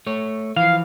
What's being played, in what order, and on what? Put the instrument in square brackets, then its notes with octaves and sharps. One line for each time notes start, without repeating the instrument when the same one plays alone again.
[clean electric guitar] A3 C#5
[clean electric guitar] E3 F3 [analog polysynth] F5